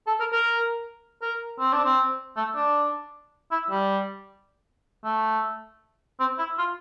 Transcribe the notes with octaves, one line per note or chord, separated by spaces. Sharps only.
A4
A#4
A#4
A#4
C4
D4
C4
A3
D4
E4
G3
A3
C4
E4
F4